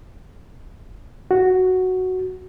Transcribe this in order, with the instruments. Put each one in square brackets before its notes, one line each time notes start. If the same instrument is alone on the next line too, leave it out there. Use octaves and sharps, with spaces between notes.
[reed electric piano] F#4